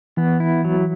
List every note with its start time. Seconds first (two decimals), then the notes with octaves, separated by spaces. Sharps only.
0.17 E3 B3
0.40 E4
0.65 F#3